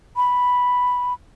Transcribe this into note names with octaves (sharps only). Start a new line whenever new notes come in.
B5